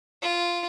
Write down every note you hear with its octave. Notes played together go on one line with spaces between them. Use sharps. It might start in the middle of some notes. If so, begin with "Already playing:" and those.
F4